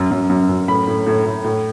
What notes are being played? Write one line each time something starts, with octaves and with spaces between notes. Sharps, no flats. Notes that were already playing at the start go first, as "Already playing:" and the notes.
Already playing: F#2
F#2
F#2
F#2
A2 B5
A2
A2
A2
A2